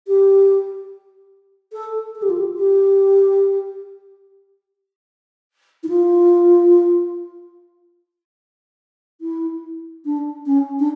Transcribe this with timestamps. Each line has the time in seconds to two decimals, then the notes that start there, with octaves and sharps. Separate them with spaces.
0.07 G4
1.73 A4
2.15 A4
2.22 G4
2.30 F4
2.38 G4
2.57 G4
5.83 E4
5.89 F4
9.21 E4
10.05 D4
10.46 C#4
10.79 D4